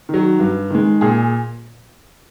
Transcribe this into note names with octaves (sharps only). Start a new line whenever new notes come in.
D#3 F#3
G2
D#3 G#3
A#2 G#4